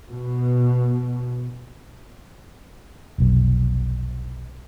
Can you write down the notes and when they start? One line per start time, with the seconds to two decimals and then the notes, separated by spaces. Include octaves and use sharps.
0.10 B2
3.18 F1 B1